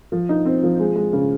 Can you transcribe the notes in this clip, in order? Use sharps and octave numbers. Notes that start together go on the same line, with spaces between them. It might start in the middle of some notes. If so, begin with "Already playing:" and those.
F3
D#4
C4
F3
G#3
G#3
C#3